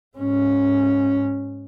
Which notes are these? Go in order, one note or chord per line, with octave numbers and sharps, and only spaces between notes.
G#2 C#4